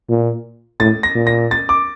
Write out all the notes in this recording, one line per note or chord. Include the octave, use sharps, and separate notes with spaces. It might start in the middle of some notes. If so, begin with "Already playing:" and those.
A#2
A2 A6
A#6
A#2
A#6
A6
D6